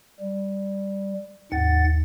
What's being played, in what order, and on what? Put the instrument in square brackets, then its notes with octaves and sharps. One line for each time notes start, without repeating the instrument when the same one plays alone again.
[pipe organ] G3
[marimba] D#2 [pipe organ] G#2 F#5 A6